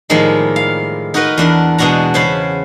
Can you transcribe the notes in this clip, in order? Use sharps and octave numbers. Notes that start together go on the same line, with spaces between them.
A2 D#3 F3 G3 G#3 A#3
F5
D#4 F#4 A#4 B4 D#5
E2 D4 A#4 A5
B2 G#3 D4 F#4 A#5
C#3 C#4 C5 A5 B5